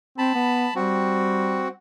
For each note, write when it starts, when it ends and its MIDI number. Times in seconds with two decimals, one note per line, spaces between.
0.18 0.32 60
0.18 0.74 81
0.18 0.74 83
0.35 0.67 59
0.75 1.72 55
0.75 1.68 60
0.75 1.68 66